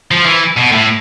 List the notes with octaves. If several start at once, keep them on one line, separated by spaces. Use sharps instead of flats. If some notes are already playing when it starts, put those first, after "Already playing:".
F3
E3
B2
A2